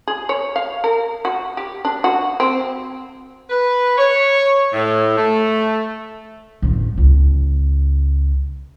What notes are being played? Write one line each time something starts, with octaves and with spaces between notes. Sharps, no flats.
G#4
C#5
F5
A#4
F#4
G4
D4
F#4
C4
B4
C#5
A2
A3
A1 E2
C#2